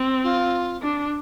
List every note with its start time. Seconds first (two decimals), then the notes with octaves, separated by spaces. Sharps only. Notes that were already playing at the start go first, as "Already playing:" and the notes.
Already playing: C4
0.24 F4
0.82 D4